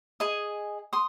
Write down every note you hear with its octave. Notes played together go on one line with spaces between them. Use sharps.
G#4 D#5 G#5
C6 D#6